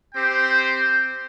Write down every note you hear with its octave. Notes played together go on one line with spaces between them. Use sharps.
C4 G4 C5 G5